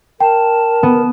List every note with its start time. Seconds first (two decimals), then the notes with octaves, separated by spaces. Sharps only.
0.20 A#4 G5 A5
0.83 B3